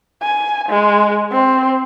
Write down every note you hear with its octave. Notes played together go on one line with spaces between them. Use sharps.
G#5
G#3
C4